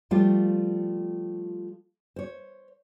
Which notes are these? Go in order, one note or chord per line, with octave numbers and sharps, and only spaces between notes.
F3 G3 A3 F4 G4 C5
C5 C#5